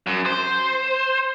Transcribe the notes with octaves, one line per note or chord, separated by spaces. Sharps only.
F#2
C5